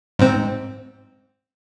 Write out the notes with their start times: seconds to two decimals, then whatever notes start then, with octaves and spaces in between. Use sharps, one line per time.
0.19 G#2 C4